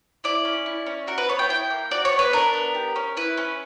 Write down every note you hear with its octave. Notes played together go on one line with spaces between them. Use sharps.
E4 D5
C#4
E4
C#4
F#4 A#4
B4
B3 C#5
G5
E4 G5
A#3
F#4 D5
C#5
B3
B4
D4 A#4
B3
G4
C#4
E4 B4
C#4